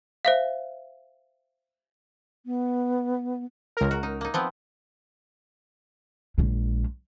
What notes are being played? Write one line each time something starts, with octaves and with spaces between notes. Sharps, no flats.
C5 E5 F5
B3
C#2 A#4
F#4
D#4
A#3 D#4
F3 B3 C4
A#1 G#3